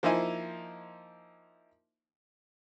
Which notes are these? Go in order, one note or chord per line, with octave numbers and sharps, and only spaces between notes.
F3 A#3 D#4 E4 C5 G#5